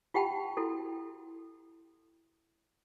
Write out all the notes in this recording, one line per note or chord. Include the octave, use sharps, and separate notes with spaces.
F4 G4 F#5 G5 A5 B5
E4 F#4 A4